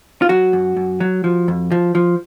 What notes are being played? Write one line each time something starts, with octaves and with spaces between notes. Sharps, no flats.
F4
F#3 F#4
F#2
F#2
F#3
F3
F2
F3
F3